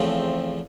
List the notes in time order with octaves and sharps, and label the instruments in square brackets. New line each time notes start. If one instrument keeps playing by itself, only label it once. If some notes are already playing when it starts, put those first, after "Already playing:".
Already playing: [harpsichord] E2 C#3 F3 A3 [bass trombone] C4